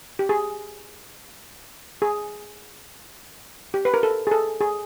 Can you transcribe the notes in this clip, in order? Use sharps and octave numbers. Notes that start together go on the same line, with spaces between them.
G4
G#4
G#4
G4
B4
A#4
A4
G#4
A4
G#4